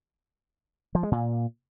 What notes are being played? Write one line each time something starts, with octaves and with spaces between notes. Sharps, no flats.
F3
G#3
A#2